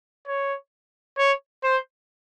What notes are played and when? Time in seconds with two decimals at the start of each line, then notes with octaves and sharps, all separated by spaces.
0.27 C#5
1.18 C#5
1.64 C5